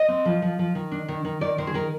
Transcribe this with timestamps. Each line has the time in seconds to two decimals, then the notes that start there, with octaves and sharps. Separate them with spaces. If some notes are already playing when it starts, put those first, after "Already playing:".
Already playing: D#5
0.08 C4
0.25 F3
0.42 F3
0.59 F3
0.75 D#3
0.92 D4
1.09 D#3
1.25 D#3
1.41 D#3 D5
1.58 D#3 C5
1.67 G#4
1.74 D#3 A#4